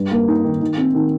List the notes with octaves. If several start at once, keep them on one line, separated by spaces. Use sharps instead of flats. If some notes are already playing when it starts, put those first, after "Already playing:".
Already playing: G2
A#3
D#4
D#3
D#3
C4
D#3